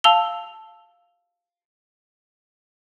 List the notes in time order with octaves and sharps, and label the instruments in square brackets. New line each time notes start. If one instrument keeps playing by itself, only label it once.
[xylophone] F5 A5 E6 F7 G7